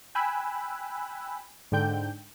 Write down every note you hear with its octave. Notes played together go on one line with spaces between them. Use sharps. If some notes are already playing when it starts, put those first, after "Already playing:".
G5 G#5 B5 E6 F#6
G#2 D3 G5 G6